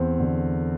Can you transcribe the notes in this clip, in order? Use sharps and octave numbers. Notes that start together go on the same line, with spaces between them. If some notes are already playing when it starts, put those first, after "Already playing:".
Already playing: E2 C4
D3